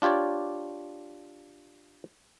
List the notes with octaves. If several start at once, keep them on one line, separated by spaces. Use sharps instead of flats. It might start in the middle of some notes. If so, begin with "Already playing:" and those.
D4 F4 G4 C#5 D5